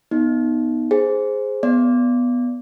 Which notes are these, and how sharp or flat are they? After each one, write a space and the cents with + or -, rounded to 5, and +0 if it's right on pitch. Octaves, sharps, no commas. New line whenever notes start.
B3 +0 D#4 +0
G#4 +0 C5 +0
B3 +0 D5 -15